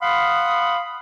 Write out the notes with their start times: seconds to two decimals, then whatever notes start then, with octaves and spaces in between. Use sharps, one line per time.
0.01 F5 F#5 B5 C6 D#6